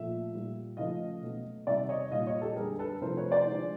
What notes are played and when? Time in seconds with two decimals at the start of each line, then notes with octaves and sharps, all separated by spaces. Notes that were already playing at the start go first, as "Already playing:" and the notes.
Already playing: A#2 F3 A3 E5
0.32 A#2 G3
0.77 C#3 F3 A3 D#5 F5
1.22 B2 F#3 A3
1.67 C3 D#3 G3 D5 E5
1.89 C#5 D#5
2.11 A#2 G3 D#5 F5
2.27 C#5 D#5
2.42 G4 A4
2.56 D3 G3 G#4 A#4
2.79 A4 B4
3.01 C3 F3 A3 A#4 C5
3.17 B4 C#5
3.31 C5 D5
3.46 D3 F3 G#3